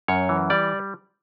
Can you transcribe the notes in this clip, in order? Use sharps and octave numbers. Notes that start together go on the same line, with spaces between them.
F#2 C#5
E3
G3 D5